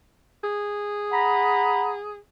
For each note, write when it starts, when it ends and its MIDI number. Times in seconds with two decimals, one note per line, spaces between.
0.44 2.19 68
1.12 1.97 78
1.12 1.90 82
1.12 1.90 83